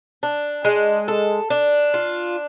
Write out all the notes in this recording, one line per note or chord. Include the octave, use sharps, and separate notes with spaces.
D4
G#3
A4
D4
F4